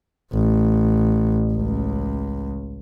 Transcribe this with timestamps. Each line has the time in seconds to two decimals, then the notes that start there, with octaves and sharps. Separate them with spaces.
0.33 A1
1.53 C#2